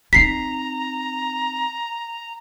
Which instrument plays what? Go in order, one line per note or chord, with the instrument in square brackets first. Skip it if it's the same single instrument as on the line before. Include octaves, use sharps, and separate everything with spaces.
[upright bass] C4 D#4 [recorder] A#5 [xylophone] B6 C7